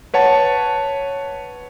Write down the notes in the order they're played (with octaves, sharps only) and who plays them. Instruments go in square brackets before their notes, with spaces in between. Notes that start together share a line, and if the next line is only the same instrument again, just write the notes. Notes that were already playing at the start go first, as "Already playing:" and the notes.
[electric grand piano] B4 C#5 F#5 A5